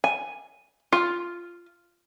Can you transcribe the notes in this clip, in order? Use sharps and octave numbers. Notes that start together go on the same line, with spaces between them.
G#5
F4